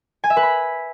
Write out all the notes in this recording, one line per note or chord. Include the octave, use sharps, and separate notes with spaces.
G#5
E5
B4
B5